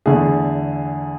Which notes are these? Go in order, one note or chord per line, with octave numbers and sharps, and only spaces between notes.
E2 D3 A3 G#4